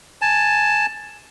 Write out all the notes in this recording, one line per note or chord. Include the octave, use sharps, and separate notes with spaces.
G#5 A5